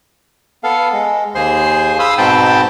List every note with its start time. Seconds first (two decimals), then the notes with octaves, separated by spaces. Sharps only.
0.64 B3 A4 F5
0.93 G#3
1.35 D#2 G#4 C5 C6
1.99 F5 B5 C6 D#6 E6
2.18 G#2 B2 C4 G5 A5 B5